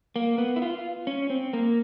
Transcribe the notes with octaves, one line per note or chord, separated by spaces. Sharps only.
A#3
B3
E4
F4
C#4
C4
A#3